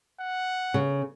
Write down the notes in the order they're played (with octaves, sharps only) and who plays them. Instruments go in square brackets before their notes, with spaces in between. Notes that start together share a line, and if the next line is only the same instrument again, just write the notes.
[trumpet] F#5
[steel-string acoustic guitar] C#3